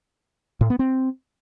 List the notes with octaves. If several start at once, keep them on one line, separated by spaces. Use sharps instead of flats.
A2
B3
C4